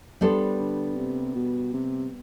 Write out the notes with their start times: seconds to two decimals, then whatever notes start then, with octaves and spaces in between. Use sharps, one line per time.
0.21 G3 B3 D4 A4 C5
0.59 D3
0.97 C3
1.35 B2
1.74 C3